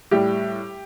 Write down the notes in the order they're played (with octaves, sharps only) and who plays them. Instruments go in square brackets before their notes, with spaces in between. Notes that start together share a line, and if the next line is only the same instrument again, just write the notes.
[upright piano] A2 G3 G4